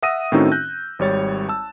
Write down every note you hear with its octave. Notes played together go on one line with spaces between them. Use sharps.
E5 F#5 D#6 E6 A#6 D#7
A2 D#3 C4 C#4 D#4 F#4
F#6 G6 A#6
G#1 G3 C#5 A6
A5 E6